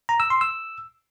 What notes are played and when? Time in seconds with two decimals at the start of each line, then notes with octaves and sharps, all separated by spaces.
0.09 A#5
0.20 E6
0.30 C6
0.41 E6